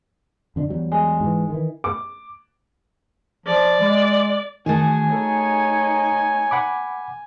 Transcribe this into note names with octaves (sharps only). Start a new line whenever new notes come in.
F2 D3 D4
E2 F#3 G3
G#3
G#2 E3
D#3 E3
D6
F3 D5
G#3
D#3 A3 F#4 G#4 G#5
D#4 A4 C#5
F#5 B5 D6